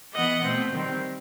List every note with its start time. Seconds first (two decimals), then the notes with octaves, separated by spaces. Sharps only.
0.14 E3 B3 D#5 F#5
0.44 B2 A3 C4
0.73 D#3 G3 C4